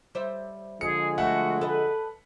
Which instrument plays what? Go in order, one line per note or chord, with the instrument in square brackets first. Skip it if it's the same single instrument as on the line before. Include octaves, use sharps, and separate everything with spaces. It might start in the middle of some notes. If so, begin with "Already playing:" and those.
[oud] G3 C5 E5
[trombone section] D3 F3 G#3 [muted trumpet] G#4 [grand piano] C#7
[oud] G3 A3 [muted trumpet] F#4 [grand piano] E5 F#5
[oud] A4 D#5 [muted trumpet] B4